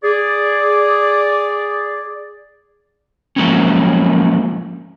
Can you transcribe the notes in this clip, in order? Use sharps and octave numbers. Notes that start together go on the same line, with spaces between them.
G#4 D5
F3 F#3 G#3 A#3 C4 C#4